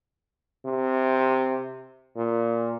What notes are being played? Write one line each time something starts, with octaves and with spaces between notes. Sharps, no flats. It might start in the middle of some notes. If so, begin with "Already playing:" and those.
C3
A#2